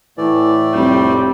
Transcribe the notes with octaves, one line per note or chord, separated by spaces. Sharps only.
A2 E3 A3 D5
F1 G3 C4